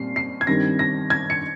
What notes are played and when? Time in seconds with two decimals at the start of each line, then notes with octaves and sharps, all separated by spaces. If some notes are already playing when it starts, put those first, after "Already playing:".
Already playing: A#2 G3 C4 C7
0.16 C7
0.41 G#6
0.47 G2 D#3 G3 C4 A#6
0.79 A#6
1.10 G#6
1.30 C#7